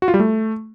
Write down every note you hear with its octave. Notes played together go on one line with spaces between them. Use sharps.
F#4
F4
G3
A3